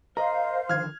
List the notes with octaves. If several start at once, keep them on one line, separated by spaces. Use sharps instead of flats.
A#4 C5 D#5 F5 A#5
D3 D#3 F3 F6 G#6